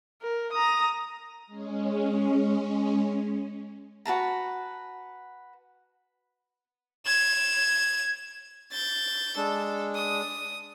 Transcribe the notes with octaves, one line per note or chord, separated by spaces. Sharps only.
A#4
A#5 D#6
G#3 C#4
F#4 B4 A5 A#5
G#6 E7
G6 A6
G#3 D4 A4
D#6